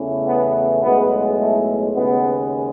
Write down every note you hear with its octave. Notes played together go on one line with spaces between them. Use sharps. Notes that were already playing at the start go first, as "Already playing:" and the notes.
Already playing: E2 C#3 E3 A3
B3
B1 A2 G#3 B3
A3
D#2 C#3 G#3 B3